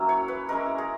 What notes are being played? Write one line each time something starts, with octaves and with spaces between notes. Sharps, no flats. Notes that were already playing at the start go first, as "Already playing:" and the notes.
Already playing: F#3 A#3 C#4 E4 E5
C#5
B4
G#3 C#4 E4 A#4
G#4